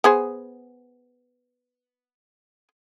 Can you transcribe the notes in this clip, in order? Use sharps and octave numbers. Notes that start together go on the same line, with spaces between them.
B3 G#4 C5